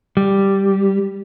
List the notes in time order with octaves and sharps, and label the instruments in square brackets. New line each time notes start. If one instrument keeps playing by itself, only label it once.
[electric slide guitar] G3